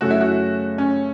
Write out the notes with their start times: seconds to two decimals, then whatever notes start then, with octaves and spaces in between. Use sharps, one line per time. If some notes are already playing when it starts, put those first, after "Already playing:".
0.01 F#2 C#3 A3 C#4 F#4 A4
0.10 E4
0.20 F#4
0.78 C#4